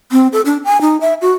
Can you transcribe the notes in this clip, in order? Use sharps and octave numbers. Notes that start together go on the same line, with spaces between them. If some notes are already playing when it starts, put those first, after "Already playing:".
C4
A4
D4
G#5
D#4
E5
F#4